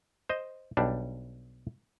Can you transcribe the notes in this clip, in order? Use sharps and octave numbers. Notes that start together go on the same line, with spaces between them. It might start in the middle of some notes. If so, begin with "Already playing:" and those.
C5 D#5
B1 G3 D4